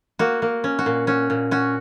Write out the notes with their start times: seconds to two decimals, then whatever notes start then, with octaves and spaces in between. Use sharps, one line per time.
0.19 A#3 F#4
0.42 A#3
0.64 C#4
0.79 F#4
0.86 A#2
1.07 C#4 F#4
1.30 A#2
1.51 C#4 F#4